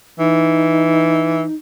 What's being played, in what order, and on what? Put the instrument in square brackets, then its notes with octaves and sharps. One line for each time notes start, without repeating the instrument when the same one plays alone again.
[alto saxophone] E3 [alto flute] D#4